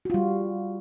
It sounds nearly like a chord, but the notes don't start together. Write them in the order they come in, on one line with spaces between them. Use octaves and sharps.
F#4 F4 G3